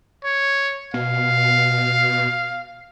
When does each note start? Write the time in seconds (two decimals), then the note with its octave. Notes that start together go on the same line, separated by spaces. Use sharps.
0.24 C#5
0.94 B2 F5